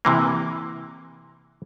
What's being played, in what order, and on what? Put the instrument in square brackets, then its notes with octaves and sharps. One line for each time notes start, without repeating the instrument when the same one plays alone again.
[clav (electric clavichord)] C3 E3 A#3